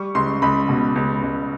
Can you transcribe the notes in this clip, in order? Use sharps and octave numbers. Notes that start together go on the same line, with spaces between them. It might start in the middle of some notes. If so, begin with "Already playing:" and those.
Already playing: G3 C#6
C#2 C6
C#2 B5
B2
C#2
C#2